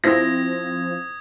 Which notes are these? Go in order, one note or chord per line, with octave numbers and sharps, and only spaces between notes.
F3 C4 E4 C5 D#6 G#6 A#6